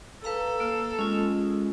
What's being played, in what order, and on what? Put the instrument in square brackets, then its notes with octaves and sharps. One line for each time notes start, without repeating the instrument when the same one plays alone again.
[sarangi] A4 [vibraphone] B4 F5 A#5
[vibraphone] A#3 E6 [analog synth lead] F5
[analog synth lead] G#3 [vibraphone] C#4 F4